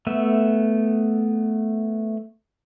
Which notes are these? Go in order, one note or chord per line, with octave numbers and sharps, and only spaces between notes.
A3 B3 E5